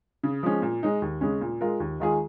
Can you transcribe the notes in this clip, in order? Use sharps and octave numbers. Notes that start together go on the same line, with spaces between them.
C#3
F3 G#3 C#4
A#2
G#3 D#4
D#2
C#3 G#3 C#4
A#2
G#3 F4 A#4
D#2
D#3 G#3 F4 G#4